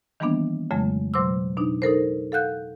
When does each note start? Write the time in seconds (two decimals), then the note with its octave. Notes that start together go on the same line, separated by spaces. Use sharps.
0.20 D#3 E3 G3 A#3 B3 D4
0.71 F2 C#3 F#3 G#3 A3
1.14 B2 F#3 C5 C6 D6 E6
1.57 B2 D4 D#4
1.82 D#4 A4 A#4 C5
2.32 A4 F5 F#5 F#6 G6